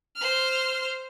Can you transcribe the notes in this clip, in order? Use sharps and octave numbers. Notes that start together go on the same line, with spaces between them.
C5 F6